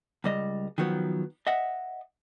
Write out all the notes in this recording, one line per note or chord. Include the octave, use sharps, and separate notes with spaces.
C#2 G3 D#5
D#3 F3 F#3 B3
D#5 E5 F#5